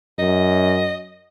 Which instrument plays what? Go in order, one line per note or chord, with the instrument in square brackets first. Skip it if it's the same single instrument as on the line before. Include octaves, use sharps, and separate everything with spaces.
[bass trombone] F#2 [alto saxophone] D#5